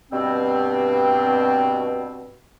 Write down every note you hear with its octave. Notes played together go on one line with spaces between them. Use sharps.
G2 B2 C4